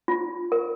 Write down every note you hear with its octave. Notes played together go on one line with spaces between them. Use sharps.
F4
A#4